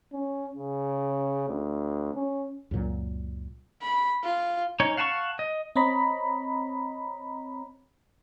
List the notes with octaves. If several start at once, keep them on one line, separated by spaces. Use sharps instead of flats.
C#4
C#3
D2
C#4
C#2 F#2 A#2 F#3
B5
F4
C#4 D#4 C#5
F5 F#5 A5 B5 C#6
D#5
C4 C#5 D#5 A#5 B5